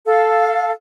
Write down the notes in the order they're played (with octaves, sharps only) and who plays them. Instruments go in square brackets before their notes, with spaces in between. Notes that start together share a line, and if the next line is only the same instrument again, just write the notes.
[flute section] A4 F5